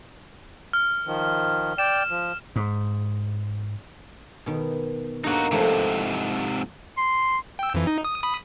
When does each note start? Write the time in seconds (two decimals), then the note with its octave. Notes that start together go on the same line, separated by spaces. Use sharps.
0.73 F6
1.06 D#3 F3
1.78 D5 G5 E7
2.10 F3
2.56 G#2
4.46 B2 D#3
5.24 G2 A#3 D#4 F#4 A5
5.51 G#2 C3 F3 A3 E4
6.97 C6
7.59 G5 E6
7.74 F2 E3
7.87 D#4
8.05 D#6
8.23 B5 D#6